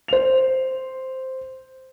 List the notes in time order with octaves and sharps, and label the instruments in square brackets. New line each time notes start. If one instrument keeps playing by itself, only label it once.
[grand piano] C5 F7